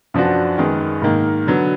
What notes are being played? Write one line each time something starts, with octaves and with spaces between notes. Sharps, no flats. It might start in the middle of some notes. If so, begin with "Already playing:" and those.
F#2 F3 B3 D4 F#4
F#2 D#3 G#3 B3
G#2 D#3 A#3
D3 F#3 B3